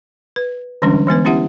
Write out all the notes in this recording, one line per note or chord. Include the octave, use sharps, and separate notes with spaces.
B4
D3 E3 G3 G#3 C#4 D4
E3 G#3 B3 B4
B3 C#4 E4 G4 E5 F#5